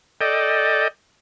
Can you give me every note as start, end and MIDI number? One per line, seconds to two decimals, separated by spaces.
0.21 0.88 69
0.21 0.88 74
0.21 0.88 75
0.21 0.88 79